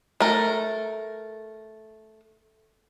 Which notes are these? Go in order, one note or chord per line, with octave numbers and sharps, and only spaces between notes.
A3 A#4